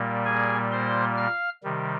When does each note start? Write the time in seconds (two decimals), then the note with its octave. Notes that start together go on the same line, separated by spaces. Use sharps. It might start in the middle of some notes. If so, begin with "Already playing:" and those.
Already playing: A#2 G3 A#3
0.25 G#4 G#5
0.72 C5 C6
1.17 F5 F6
1.63 C3 D#3 G3